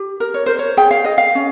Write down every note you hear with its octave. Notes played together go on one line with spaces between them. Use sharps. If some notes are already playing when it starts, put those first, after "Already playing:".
Already playing: G4
A#4
C#5
A#4 C5
C#5
G#4 G5
F5
G#4 D#5
F5
C#4